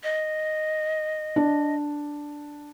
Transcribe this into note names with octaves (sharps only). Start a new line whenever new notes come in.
D#5
D4